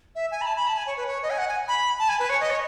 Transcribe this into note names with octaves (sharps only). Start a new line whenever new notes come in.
E5
G#5
B5
A5
B5
A5
G#5
C#5
B4
C#5
D#5
G#5
F#5
G#5
B5
A5
G#5
B4
C#5
D#5
C#5